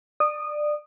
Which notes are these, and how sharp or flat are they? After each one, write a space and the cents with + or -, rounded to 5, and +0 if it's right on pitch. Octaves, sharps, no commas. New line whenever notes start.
D5 +20 D#6 -15